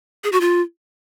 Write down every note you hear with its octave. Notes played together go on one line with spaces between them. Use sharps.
G#4
F#4
F4